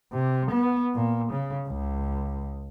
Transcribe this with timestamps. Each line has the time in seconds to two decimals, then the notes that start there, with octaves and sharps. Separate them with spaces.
0.12 C3
0.51 B3
0.94 A#2
1.32 C#3
1.68 C#2